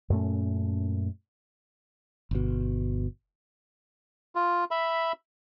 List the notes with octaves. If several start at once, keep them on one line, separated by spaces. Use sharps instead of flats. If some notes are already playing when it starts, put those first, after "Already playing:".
F#2 A#2 A3 C#4
G1 B2
F4
E5 B5